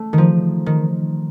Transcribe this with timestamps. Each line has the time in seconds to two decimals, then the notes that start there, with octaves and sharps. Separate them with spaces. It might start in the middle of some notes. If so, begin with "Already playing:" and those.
Already playing: A3
0.13 D#3
0.18 F3
0.66 D#3